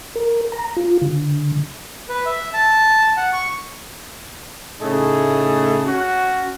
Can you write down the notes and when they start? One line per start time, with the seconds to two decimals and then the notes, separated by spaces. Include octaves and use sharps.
0.16 A#4
0.52 A#5
0.77 F4
1.02 D3
2.09 B4
2.26 E5
2.54 A5
3.17 F#5
3.33 C#6
4.81 A2 C#3 A3 D#4 G#4 A5
5.86 C#4 F#4